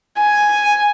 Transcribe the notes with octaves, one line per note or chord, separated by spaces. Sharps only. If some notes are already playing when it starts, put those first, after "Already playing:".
G#5